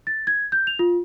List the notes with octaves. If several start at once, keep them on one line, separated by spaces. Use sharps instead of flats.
A6
G#6
G6
F7
F4